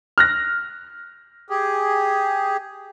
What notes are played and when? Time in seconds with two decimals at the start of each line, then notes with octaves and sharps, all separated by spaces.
0.18 F6 F#6 A#6
1.50 G4 G#4